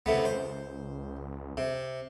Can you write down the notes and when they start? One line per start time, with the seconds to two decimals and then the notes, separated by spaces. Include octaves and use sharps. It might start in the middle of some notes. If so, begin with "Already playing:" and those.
0.06 C#2 C3 A3 B3
0.25 C5
1.57 C3